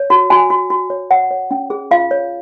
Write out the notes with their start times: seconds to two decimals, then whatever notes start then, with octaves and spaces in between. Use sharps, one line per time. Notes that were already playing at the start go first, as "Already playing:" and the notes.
Already playing: C#5
0.10 F#4
0.30 F#4 G#5
0.50 F#4
0.70 F#4
0.90 C#5
1.11 C#5 F#5
1.31 C#5
1.51 C#4
1.70 G#4
1.91 F4 F5
2.11 C#5